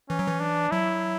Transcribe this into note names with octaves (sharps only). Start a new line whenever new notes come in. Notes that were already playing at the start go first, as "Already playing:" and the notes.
E3 C#4
F#3
E3
D4
F#3 E4